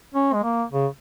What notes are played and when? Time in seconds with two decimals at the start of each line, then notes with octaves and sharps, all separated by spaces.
0.14 C#4
0.34 G#3
0.44 A#3
0.72 C#3